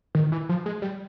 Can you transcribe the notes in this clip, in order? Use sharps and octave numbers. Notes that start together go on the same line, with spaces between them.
D#3
E3
F3
G#3
G3